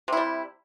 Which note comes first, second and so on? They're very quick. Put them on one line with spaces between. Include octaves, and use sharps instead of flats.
C3 E4 G3